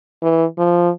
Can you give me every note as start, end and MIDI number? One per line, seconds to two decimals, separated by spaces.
0.23 0.45 52
0.58 0.90 53